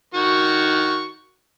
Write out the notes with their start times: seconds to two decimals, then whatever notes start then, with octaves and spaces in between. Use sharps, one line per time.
0.14 D#3 F#4 C#6